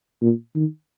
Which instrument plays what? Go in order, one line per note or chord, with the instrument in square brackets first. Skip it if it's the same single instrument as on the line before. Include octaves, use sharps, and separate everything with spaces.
[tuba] A#2
D#3